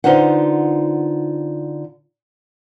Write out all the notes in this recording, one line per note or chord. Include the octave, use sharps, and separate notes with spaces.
D3 D#4 F4 B4 C5 F#5